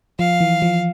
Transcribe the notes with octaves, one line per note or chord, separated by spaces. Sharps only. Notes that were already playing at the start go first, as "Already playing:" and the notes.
F3 F5
E3
F3